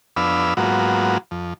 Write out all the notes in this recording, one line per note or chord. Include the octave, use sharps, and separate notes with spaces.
F2 B3 D4 F5 B5 E6
G#2 F#3 A#3 B3 F4 F#4
F2